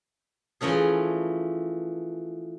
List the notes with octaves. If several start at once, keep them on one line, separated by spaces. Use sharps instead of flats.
E3 F3 A3 C#4 G#4